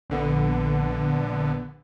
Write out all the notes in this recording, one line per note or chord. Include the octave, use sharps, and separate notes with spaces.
A#1 D3 B3